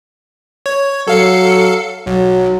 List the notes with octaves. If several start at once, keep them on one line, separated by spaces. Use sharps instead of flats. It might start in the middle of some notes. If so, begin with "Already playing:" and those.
C#5
F#3 A4 F5 C#7
B1 F#3